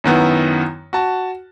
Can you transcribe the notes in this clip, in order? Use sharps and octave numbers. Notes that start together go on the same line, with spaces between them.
F#2 D#3 B3 E4
F#4 A5